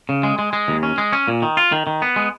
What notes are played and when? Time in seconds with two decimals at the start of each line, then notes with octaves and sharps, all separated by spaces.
0.09 C#3
0.23 G#3
0.39 G#3
0.53 G#3
0.68 D#2
0.83 C#4
0.98 G#3
1.13 C#4
1.28 A#2
1.42 D#3
1.57 F4
1.72 D#3
1.87 D#3
2.02 B3
2.16 G#3